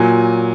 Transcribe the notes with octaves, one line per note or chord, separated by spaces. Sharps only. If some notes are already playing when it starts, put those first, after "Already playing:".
Already playing: A#2 F#3 G#5